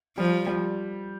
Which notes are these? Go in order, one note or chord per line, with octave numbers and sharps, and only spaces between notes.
F3 G3
G3